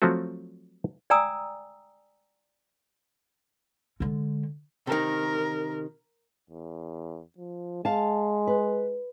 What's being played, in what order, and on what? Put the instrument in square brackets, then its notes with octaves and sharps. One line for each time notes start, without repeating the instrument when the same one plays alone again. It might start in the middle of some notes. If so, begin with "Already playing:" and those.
[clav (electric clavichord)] F3 F#3 A3 C4 F#4
[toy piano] D5 G5 G#5 A#5 D#6 E6
[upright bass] D3 G#3
[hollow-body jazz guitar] C3 D#3 [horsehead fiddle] A#4
[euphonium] E2
F3
[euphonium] G#3 [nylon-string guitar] F5 A5
[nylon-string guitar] B4